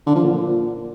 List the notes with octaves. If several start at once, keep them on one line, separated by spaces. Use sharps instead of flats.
D3
F3
A#2